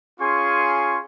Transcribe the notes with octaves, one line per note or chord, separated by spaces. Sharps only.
C#4 F4 G#4 G#5 C6 C#6